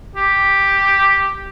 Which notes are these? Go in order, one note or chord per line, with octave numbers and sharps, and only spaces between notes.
G4